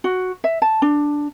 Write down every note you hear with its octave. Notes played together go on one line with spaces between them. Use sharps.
F#4
E5
A5
D4